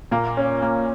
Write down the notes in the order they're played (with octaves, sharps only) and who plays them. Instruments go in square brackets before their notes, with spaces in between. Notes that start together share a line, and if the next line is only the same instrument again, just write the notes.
[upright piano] A#2 [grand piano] A#3
[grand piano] C#4
A#3